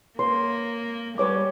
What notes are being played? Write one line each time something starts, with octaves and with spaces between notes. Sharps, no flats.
A#3 B4 C#5 C6
G3 B4 C#5 D6